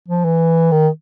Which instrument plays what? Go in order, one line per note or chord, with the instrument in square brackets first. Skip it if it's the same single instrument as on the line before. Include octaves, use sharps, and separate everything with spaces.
[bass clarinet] F3
E3
D#3